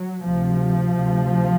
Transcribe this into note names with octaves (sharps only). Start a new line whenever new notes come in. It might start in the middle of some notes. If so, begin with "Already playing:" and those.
Already playing: F#3
D2 C3 F3
D2 C3